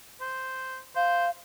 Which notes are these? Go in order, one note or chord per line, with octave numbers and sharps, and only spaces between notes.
C5
C5 F5